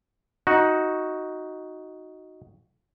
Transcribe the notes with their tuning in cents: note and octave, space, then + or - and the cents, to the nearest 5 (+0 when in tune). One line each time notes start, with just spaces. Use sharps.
D#4 +10 F#4 +0